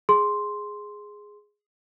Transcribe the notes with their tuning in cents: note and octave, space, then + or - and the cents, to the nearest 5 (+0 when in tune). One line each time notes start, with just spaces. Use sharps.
G#4 +0 C6 +0